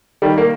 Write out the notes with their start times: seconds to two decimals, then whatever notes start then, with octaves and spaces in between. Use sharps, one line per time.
0.22 D#3 G3
0.38 A#3